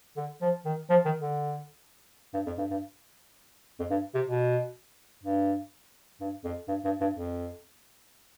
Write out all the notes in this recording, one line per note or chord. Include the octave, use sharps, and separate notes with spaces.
D3
F3
D#3
F3
D#3
D3
G2
F2
G2
G2
F2
G2
C3
B2
G2
G2
F2
G2
G2
G2
F2